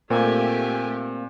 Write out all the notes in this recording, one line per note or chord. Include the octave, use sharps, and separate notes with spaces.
A#2 A3 A#3 C4 G4 G#5